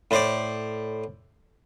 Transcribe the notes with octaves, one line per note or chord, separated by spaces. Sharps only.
A2 C5 D5